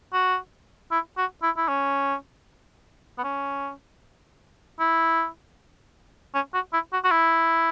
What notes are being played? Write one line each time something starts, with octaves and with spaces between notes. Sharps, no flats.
F#4
E4
F#4
E4
E4
C#4
B3
C#4
E4
C#4
F#4
E4
F#4
F#4
E4